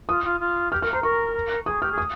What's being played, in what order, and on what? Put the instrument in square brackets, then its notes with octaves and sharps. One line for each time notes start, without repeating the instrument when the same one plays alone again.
[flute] F4 [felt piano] D#6
[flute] F4
F4
[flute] G4 [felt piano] F6
[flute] A#4 [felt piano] F6
[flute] C5 [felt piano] A#5
[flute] A#4 [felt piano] C#6
[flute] G#4 [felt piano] D#6
[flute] G4 [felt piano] F6
[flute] G#4
[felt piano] D#6